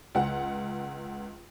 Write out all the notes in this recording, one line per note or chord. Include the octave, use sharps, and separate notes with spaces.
C#2 F#5